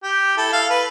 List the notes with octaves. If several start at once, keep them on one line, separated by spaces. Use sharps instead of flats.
G4
E4 A4
A4 F5
B4